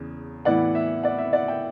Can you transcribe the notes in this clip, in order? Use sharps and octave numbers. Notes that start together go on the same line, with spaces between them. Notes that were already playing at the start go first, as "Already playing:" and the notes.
Already playing: E2 C#3
A2 E3 B3 E4 D5 F#5
E5
D5 F#5
E5
D5 F#5
E5 G5